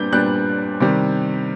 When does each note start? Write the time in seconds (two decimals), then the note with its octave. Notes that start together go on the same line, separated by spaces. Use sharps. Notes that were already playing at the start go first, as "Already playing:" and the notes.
Already playing: A#2 G3 B3 D4 G6
0.12 A#2 G3 B3 D4 F#6
0.80 C3 D#3 G3